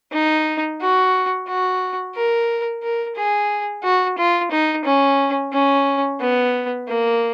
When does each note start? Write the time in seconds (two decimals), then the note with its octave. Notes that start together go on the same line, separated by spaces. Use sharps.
0.12 D#4
0.81 F#4
1.48 F#4
2.16 A#4
2.83 A#4
3.16 G#4
3.84 F#4
4.18 F4
4.51 D#4
4.85 C#4
5.53 C#4
6.20 B3
6.88 A#3